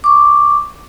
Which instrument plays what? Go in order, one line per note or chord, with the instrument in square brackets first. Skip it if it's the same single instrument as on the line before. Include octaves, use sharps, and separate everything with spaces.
[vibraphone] C#6 D6